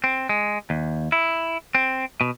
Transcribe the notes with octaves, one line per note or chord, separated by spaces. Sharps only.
C4
G#3
D#2
E4
C4
B2